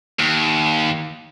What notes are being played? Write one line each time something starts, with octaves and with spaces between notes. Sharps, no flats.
D#2